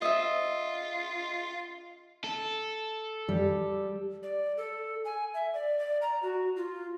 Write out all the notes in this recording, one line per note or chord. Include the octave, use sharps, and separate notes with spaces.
F4 D#5 E5
A4
G3
D5
A4
G#5
E5
D5
D5
A#5
F#4
F4